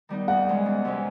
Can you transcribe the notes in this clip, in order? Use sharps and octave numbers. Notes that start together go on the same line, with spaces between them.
D#3 G3 B3 D#4
E2 F#5
C3 E3 G#3 C#4
E2
C3 E3 G#3 C#4